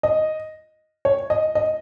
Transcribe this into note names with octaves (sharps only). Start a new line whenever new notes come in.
D#5
C#5
D#5
D#5